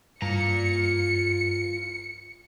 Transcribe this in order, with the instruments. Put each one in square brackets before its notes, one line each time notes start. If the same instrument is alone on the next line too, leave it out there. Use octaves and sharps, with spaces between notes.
[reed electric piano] G2 [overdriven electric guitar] F4 A#5 [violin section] C#7